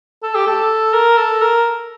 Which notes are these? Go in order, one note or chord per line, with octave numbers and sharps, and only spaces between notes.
A4
G4
A4
A#4
A4
A#4